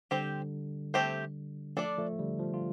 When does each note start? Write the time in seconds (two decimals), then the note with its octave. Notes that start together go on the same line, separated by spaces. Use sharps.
0.11 D3 G3 C4 G4 C5
0.94 A3 C4 G4 C5
1.77 F3 A3 D4 A4 D5
1.98 F3 A3
2.19 D3 G3
2.39 F3
2.54 F4